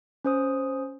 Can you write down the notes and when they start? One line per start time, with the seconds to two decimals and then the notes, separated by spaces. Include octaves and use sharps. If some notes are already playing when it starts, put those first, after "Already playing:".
0.25 C#4 C5 D#6